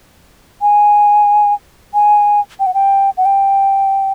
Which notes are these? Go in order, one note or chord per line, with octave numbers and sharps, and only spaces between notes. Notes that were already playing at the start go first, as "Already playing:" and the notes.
G#5
G#5
G5
F#5
G5
F#5
G5